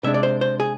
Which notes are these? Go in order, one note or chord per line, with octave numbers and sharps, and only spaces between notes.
C3 G#3 D4 E5
D5
C5
C5
G#4